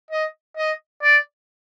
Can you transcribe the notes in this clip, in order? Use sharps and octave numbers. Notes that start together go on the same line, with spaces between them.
D#5
D#5
D5